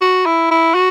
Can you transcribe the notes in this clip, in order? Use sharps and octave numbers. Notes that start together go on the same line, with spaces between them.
F#4
E4
E4
F#4